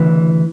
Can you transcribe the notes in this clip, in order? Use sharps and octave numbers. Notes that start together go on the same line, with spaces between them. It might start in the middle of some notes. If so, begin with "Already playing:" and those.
Already playing: D2 C#3 E3